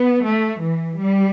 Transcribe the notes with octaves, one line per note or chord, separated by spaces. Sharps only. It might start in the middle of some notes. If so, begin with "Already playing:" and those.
Already playing: B3
A3
E3
G3